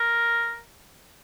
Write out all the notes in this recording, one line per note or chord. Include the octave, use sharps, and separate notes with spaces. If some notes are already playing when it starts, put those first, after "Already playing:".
Already playing: A#4